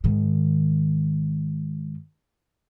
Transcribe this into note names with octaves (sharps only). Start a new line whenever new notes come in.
G#2 D#3